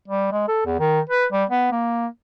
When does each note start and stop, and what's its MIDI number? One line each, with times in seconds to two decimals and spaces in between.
0.08 0.28 55
0.32 0.47 56
0.48 0.61 69
0.66 0.75 40
0.79 1.00 51
1.10 1.25 71
1.32 1.44 55
1.50 1.69 59
1.72 2.07 58